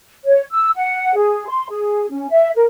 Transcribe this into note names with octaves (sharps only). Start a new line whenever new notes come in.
C#5
E6
F#5
G#4
C6
G#4
C#4
E5
A#4